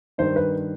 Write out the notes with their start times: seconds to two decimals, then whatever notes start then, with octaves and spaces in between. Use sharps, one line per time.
0.18 G2 D#3 C5
0.36 B4